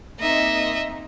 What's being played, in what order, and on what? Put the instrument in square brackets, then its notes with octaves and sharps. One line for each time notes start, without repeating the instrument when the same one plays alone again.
[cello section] A#3 C4 D#4 [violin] D#5 E5